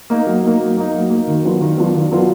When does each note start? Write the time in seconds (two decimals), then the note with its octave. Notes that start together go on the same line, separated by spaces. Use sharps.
0.10 A#3 D#4
0.26 F#3
0.44 A#3 D#4
0.60 F#3
0.77 A#3 D#4
0.94 F#3
1.10 A#3 D#4
1.28 D#3
1.45 F#3 B3 D4 F4
1.61 D#3
1.78 F#3 B3 D4 F4
1.94 D#3
2.11 F#3 B3 D4 F4